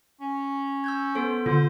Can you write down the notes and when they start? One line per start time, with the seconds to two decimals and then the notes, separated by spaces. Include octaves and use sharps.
0.21 C#4
0.84 E6 G6 G#6
1.15 B3 A4 C5
1.46 D3 F4 C5